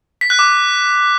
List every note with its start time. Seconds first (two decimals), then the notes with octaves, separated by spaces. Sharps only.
0.21 B6
0.30 F#6
0.39 D6